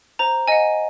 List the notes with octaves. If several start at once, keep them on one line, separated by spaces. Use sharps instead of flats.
C5 A#5
D#5 F#5 G#5